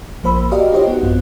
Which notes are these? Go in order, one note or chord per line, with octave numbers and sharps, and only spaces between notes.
A#1 F3 A#3 C5 B5 E6
F#4 G4 A#4 D5 D#5 F5
D#4 F4 G4 C5 C#5 D#5
B3 F#4
A1 F#2 B3 C4 F4